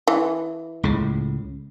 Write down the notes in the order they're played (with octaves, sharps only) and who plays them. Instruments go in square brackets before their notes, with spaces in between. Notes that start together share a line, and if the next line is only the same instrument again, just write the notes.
[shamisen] E3
[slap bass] C#2 A2 C#3